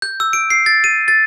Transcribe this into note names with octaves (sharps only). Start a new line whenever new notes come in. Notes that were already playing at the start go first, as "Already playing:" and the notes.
G6
E6
D7
C7
A6
D#7
A6